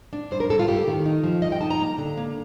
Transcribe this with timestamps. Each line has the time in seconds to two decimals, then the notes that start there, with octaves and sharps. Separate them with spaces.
0.13 D4
0.31 G2 C5
0.40 A#4
0.50 G2 A4
0.59 F4
0.68 A3 G4
0.87 D#3
1.06 D#4
1.24 F3
1.42 G2 D#5
1.52 G5
1.61 D#4 A5
1.71 A#5
1.79 A#3
1.98 D3
2.17 A#3